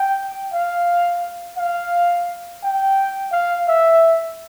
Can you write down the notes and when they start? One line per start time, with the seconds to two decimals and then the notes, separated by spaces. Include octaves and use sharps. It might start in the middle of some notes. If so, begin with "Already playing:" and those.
Already playing: G5
0.53 F5
1.58 F5
2.63 G5
3.32 F5
3.68 E5